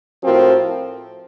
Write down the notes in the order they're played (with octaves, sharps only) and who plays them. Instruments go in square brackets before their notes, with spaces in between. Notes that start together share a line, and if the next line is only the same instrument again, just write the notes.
[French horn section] A2 F3 C4 F#4 A#4